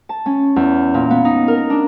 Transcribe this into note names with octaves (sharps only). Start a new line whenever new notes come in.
A5
C#4
E2
A#2
B3
D#4
A#4
D4